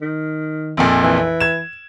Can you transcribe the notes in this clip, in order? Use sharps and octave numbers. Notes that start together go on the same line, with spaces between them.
D#3
A#1 F2 A#2
E3
G#6 E7